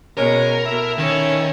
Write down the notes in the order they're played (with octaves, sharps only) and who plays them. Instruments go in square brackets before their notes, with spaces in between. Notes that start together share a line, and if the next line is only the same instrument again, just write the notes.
[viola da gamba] B2 [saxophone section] G#3 C#4 [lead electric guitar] A#4
[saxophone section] A2 E5
[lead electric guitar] D#3 [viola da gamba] C#4